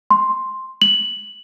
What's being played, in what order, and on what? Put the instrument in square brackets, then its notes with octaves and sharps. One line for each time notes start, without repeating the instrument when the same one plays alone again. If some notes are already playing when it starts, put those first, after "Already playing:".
[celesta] C6
F#7